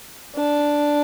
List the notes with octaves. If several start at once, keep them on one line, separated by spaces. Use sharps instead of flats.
D4